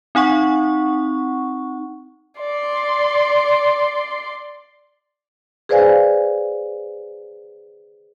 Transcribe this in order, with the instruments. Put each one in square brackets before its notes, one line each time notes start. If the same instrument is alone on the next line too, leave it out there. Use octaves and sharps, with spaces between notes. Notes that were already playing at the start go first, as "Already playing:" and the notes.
[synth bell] C4 D#4 F#5 C#6
[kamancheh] D5 C6
[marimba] G#4 B4 C5 D5 F5 G#5